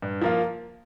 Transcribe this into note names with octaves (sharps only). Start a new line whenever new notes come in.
G2
F3 A#3 F4